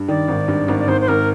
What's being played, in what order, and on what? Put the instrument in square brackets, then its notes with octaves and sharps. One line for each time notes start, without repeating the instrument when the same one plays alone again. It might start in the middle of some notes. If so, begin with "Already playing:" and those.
Already playing: [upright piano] G2
[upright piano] D#3 [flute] D5
[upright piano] G#1
G2
G#1
[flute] D5
[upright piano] G#1 [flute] C5
[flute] C5
[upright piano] G#1 [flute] A#4